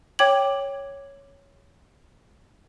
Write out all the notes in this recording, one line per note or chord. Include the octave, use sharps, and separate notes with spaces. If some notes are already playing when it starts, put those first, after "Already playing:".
C#5 G5 D6 G#6 F#7